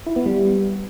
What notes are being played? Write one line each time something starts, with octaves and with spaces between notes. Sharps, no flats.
E4
B3
G3